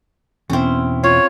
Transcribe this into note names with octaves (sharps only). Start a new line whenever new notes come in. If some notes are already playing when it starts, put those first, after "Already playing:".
E2 B2 C4 C#4 E4
F4 C#5